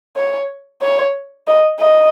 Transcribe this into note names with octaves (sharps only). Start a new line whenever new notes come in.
C#5
C#5
D#5
D#5